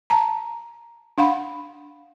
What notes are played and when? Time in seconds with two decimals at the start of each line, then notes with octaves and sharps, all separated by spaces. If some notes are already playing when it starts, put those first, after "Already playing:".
0.10 A5 A#5
1.18 D4 F5 F#5 B5